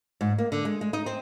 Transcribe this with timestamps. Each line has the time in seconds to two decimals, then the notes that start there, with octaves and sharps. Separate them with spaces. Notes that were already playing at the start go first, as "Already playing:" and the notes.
0.21 G#2
0.38 A#3
0.52 D3
0.65 G#3
0.81 G#3
0.93 D#4
1.06 C4